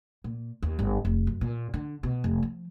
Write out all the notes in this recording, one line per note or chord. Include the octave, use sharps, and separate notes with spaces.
A#2
D#2
G1
F1
F#2
A#2
D3
B2
F1
F3